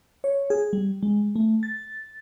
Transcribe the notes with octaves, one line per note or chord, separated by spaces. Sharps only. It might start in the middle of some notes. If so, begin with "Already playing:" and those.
C#5
G#4
G3
G#3
A3
A6